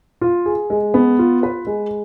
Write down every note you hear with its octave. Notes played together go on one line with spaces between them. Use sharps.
F4
G#4
G#3
B3
F4
B4
G#3